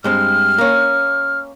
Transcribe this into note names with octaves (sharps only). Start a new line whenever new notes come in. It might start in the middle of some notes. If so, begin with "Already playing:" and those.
G2 G#3 C4 F6
A#3 C#4